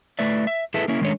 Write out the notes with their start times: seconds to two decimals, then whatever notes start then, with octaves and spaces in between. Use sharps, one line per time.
0.19 A3 E4 B4 D5 E5
0.47 E5
0.74 E4 G#4 A4 B4 E5
0.88 A#3 C#4 E4
1.02 D#3 G#3 A3 C#4 D4 C#5